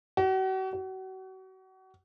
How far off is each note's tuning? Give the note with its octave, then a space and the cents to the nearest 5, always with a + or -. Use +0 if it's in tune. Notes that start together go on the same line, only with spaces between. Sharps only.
F#4 +40
F#4 +35